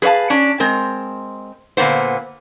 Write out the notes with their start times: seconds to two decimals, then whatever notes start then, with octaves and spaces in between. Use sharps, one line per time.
0.02 G#4 B4 C#5 F5 A5
0.30 C#4 D4
0.60 G#3 C4 A#4
1.77 A#2 D3 A#3 B3 C5